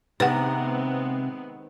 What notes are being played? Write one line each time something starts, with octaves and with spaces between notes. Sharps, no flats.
C3 D#3 G#3 B3 C4 B4 F#5